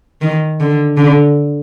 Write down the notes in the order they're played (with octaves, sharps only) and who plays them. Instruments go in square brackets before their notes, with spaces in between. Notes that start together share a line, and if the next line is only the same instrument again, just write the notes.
[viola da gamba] D#3
D3
D3